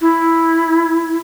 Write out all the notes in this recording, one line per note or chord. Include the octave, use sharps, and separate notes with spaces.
E4